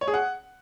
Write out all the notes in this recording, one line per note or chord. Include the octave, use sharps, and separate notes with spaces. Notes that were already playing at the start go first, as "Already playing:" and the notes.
C#5
G#4
F#5